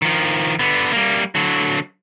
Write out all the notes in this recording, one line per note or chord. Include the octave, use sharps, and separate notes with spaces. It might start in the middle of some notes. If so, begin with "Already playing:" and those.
D#3 F3
D3 B3
G3 A#3
D3 F#3